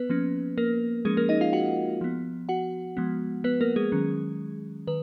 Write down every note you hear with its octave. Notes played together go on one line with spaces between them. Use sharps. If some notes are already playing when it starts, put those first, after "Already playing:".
Already playing: B3 B4
F3 A#3 C#4
A#3 A#4
F3 G#3 A#3 C#4 G#4
A#3 A#4
D#4 D#5
F4 F5
F#4 F#5
F3 B3
F#4 F#5
F3 G#3 B3
B3 B4
A#3 A#4
G#3 G#4
D#3 F#3 C#4
D#3 B4